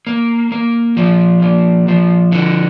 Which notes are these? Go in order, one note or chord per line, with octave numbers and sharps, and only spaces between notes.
A#3
A#3
F3
A#3
F3
D3